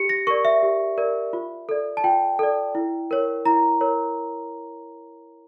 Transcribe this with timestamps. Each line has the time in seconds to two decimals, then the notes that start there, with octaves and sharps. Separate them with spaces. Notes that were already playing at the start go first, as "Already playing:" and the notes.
Already playing: G4 C#7
0.09 A#6
0.27 A#4 D5 C#6
0.45 E5
0.63 G4
0.98 A#4 D5
1.33 F4
1.69 A4 D5
1.97 A5
2.04 F4 G5
2.39 A4 D5
2.75 E4
3.11 A#4 C#5
3.45 E4 A#5
3.81 A#4 C#5